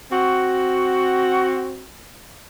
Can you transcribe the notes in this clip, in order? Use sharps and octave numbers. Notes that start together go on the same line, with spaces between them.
C4 F#4